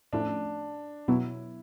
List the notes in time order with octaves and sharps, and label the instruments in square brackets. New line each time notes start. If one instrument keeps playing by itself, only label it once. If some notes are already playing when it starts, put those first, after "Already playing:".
[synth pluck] A2 F3 A3 C#4 E4 [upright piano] D4
[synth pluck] B2 F#3 B3 [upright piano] E4